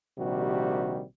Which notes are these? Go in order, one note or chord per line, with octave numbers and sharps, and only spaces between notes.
A#1 C3 D#3 G3 F#4